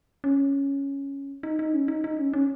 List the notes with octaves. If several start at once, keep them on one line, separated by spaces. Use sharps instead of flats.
C#4
D#4
D#4
C#4
D#4
D#4
C#4
C#4